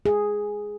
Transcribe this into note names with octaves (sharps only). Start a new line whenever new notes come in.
G#4